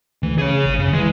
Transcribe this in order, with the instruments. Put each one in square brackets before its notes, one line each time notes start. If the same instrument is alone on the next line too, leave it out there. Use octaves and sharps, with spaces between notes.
[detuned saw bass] D2 [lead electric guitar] E3
[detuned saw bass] C#3 [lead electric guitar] G#4 C#5
[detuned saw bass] G#1
[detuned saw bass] F#2 [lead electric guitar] C#3
[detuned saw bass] E3 [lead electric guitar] G#3